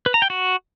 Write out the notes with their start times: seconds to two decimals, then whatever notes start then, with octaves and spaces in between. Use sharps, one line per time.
0.06 B4
0.14 A#5
0.22 G5
0.30 F#4